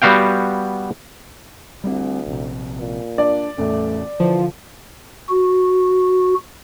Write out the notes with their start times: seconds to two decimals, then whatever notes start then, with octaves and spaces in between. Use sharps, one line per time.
0.02 G3 B3 F#4 F5 G5
1.84 D2 G3 A#3 C4
2.27 A#1 C3
2.79 A#2
3.18 D4 D5
3.58 E2 A2 A3 C#4
4.20 D3 E3 F3
5.29 F#4